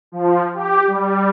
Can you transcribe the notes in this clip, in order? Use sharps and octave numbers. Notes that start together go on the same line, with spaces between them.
F3
G4
G3